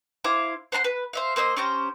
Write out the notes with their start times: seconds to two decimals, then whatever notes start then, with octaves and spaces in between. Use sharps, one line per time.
0.24 E4 C5 F5 D6
0.72 C5 F#5 A#5 C6
0.84 B4
1.13 C5 E5 F5
1.36 A#3 C5 D#5 E6
1.57 C#4 G4 C5 A#5